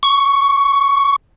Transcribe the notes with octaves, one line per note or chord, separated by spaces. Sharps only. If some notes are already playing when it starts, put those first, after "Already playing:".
C#6